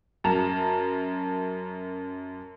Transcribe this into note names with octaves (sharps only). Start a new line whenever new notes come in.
F#2 A5 A#5